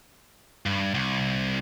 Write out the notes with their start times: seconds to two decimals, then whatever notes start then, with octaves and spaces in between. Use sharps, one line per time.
0.66 G2
0.94 C2